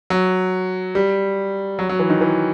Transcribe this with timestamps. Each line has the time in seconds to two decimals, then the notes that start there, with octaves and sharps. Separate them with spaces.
0.10 F#3
0.95 G3
1.79 F#3
1.89 F#3
2.00 E3
2.10 D#3
2.21 E3